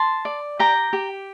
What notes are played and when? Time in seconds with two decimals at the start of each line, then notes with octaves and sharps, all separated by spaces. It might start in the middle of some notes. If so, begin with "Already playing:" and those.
Already playing: A5 C6
0.25 D5
0.59 G4 G5 A#5
0.93 G4